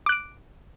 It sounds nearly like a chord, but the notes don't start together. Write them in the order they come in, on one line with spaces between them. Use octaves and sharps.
D6 F#6 D7